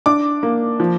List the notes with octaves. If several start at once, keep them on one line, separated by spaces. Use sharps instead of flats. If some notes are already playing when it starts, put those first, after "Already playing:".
D4 D6
A#3
F3